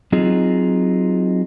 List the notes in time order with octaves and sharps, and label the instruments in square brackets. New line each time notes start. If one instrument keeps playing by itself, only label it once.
[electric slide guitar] F#3 C4 D#4 F4 G#4